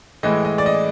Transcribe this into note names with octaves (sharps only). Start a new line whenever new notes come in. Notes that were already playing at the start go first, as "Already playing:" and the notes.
A2 E3 G#3 D#5
D#5
D5
D#5